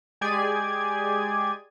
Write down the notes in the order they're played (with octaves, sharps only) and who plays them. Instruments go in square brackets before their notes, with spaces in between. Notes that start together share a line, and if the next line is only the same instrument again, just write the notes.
[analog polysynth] G#3 G4 G#4 D5 G#5 G#6